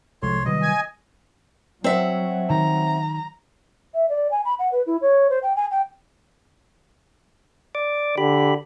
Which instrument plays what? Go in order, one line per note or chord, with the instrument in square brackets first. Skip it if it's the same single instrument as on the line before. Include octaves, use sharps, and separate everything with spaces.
[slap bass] C2 [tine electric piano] F3 G#3 A4 [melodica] C#5 C6
[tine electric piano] C3 F#3 B4 [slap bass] D#3 G3 [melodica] D#5
[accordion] G#5
[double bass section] F#3 [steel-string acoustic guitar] C4 E5 F#5
[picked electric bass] D#3 [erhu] A#5
[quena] E5
D5
G#5
B5
F#5
B4
E4
C#5
C5
G5
G#5
G5
[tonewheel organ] D5 D6
[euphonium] D3 [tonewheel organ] G4 B5